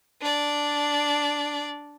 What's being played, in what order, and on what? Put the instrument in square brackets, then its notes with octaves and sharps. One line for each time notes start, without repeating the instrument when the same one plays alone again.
[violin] D4 D5